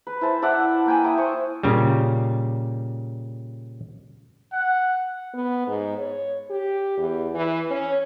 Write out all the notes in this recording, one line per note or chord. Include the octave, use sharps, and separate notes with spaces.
B4
E4 C5 A5
A4 D5 E5 F#5
A#3 G5 G#5
E4 A5 D#6
C5 C#6
A#2 C#3 G3
F#5
B3
G#2
C#5
G4
E2
E3
C#4